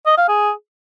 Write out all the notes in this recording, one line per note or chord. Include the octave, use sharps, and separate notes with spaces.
D#5
F5
G#4